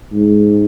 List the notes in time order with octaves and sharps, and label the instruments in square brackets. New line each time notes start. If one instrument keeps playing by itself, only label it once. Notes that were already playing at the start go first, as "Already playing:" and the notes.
[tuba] G#2